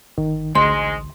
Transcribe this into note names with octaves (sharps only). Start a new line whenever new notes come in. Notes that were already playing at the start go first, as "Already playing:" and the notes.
G1 D#3
A1 D2 G#2 G#3 C6